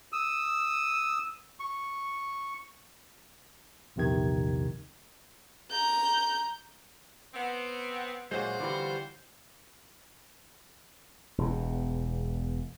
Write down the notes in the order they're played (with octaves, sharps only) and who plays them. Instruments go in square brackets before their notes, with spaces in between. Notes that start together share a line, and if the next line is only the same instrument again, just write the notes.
[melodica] D#6 E6
C#6
[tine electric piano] A#1 E2 C3 D#3 G#6
[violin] A#5 G6
[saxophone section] B3 C4
[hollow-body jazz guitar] A#2 F#3 G#3 [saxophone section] F4 F#4 C5
[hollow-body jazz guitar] D3 E3 G3
[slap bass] E1 E2